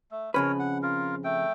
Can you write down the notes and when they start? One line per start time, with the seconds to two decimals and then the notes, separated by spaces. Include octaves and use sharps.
0.11 A3
0.34 F2 C#3 A#4 B4 C#5
0.59 F#5
0.83 F4 A#4
1.24 A3 G5